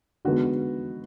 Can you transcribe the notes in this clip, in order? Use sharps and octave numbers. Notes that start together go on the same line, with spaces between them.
D3 G#3 B3 D#4 F#4